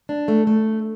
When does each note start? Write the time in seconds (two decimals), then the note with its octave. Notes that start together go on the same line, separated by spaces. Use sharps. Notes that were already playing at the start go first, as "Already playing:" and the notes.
0.09 D4
0.28 A3
0.47 A3